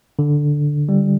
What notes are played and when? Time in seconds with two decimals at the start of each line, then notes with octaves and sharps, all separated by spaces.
0.19 D3
0.89 G3